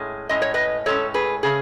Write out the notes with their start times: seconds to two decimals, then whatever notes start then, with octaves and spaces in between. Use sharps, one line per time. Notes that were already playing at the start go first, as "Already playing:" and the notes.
Already playing: A2 G#3 C#4
0.29 A2 G#3 C#4 D#5
0.42 C#5
0.54 B4 D#5
0.86 A2 G#3 C#4 A4 C#5
1.14 G#4 B4
1.43 C#3 A3 C#4 G#4